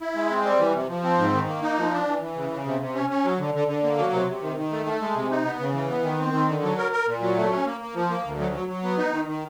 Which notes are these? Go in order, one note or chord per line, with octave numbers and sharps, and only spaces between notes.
E4
G#3
C4
G3
E3
C3
F3
C4
G#2
D#3
A#3
D#4
F3
D4
E3
E3
C#3
C#3
C3
C3
C#4
C#4
F#3
D3
D3
D3
A#3
F#3
C3
C3
D#3
D#3
A3
A3
G#3
C3
D#4
B3
C#3
E3
B3
D#3
C4
D#3
D3
F#3
A#4
A#4
A#2
F#3
A3
C#4
A#3
A#3
F3
A#3
D2
F#3
F#3
F#3
B3
D#4
D#3
D#3